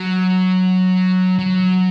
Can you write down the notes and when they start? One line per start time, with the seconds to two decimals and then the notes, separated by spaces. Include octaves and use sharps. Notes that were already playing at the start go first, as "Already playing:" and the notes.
Already playing: F#3
1.39 F#3